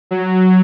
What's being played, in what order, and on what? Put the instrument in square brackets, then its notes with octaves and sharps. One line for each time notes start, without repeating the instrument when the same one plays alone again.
[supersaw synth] F#3